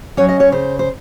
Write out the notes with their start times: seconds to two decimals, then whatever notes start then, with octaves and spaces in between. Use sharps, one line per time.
0.17 F#3 C#4 C#5
0.29 D#5
0.40 C#5
0.52 C#3 C5
0.79 C5